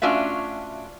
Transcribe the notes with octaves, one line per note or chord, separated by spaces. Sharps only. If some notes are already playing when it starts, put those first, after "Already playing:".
A3 C#4 D4 F4 F#4 E5